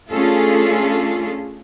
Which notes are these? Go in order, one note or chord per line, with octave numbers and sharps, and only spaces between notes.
A3 C#4 D4 F4 G#4 A4